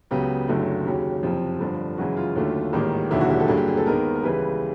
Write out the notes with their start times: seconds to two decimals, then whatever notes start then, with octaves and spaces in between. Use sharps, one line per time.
0.11 C#2 C#3 F#3 B3 G4
0.48 F#1 F#2 D3 F#3 A3
0.85 D#2 C#3 F#3 G4
1.23 F#1 F2 C3 F3
1.60 G1 G2 D3 F3
1.98 F#2 C#3 E3 G#3 F#4
2.17 F4
2.36 D#2 D3 F#3 A3
2.73 A1 G#2 D#3 G3 A#3
3.10 E1 D#2 D3 F#3 E4
3.21 F#4
3.30 G4
3.40 A4
3.48 G2 D3 F#3 A#3 G#4
3.57 G4
3.68 G#4
3.77 A4
3.86 D#2 D#3 G#3 B3 A#4
4.15 A#4
4.23 C#2 C#3 E3 G3 B4